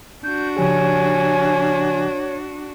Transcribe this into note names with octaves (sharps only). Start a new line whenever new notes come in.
D4 F#4 G6
C#3 F3 G4 C#5 G#5